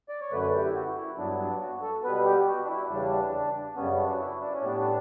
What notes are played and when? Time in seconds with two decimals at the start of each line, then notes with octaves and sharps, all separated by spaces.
0.09 D5
0.21 C#5
0.32 F#2 D3 A3 B4
0.53 G4
0.65 E4
0.74 F#4
0.96 E4
1.18 G2 F#3 B3 D4
1.39 D4
1.60 F#4
1.82 A4
2.04 B2 G3 B3 B4
2.25 G4
2.47 F#4
2.63 D4
2.68 E4
2.89 E2 C#3 G3 D4
3.75 F#2 C#3 G3 B3 C#4
3.92 C#4
3.98 D4
4.09 F#4
4.19 E4
4.41 D4
4.53 C#4
4.62 A2 G3 B3 D4